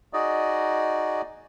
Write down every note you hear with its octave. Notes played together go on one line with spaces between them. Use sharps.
D#4 F#4 G#4 D5 D#5